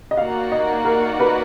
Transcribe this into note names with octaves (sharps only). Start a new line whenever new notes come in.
D#5
A#3 D#4 F#4 D5 F5 F#5
D#5
A#4
B4